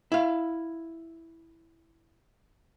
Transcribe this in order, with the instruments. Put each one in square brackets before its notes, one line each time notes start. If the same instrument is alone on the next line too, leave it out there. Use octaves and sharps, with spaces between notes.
[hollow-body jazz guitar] E4 F5